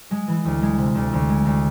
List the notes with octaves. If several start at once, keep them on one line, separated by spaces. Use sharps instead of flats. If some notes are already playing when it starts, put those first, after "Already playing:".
G#3
E3
D2
G#3
C3
D2
D2
G#3
D2